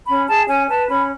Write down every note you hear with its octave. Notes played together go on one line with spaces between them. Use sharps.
C#4 B5
G#4 A5
C#4 G#5
B4 A5
C#4 B5